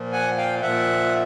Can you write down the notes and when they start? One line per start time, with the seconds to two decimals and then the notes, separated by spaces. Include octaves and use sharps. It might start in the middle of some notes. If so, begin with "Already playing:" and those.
Already playing: A#2 F3
0.12 F#5 G#5
0.37 F5 G5
0.62 A#2 F3 E5 F#5